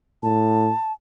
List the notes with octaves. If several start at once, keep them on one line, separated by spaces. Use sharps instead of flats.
A2 A5